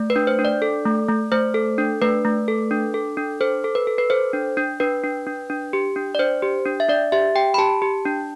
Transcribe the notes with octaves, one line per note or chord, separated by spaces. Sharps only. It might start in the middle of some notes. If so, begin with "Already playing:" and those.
Already playing: A3
B4
D4
C5
D4
D5
A4
A3
A3
A3 C5
A4
D4
A3 B4
A3
A4
D4
A4
D4
A4 C5
A4
B4
A4
B4
A4 C5
D4
D4
D4 B4
D4
D4
D4
G4
D4
D5
D4 C5
G4
D4
E5
D4 D5
G4 E5
G4 G5
B5
G4 A5
G4
D4